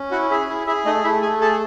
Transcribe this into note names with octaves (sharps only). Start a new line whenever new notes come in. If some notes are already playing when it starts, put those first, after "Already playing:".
Already playing: C#4
E4 F#4 F#5
E4 G#4 E5
E4
E4 G#4 E5
A3 D#4 D#5
A3 E4 E5
A3 G#4 G#5
G#4 A4 A5